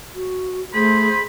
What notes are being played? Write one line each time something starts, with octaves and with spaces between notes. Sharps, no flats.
F#4
A3 G#4 C5 B5